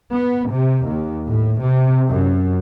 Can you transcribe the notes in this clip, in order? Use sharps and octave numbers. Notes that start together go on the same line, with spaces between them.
B3
C3
D#2
A2
C3
F#2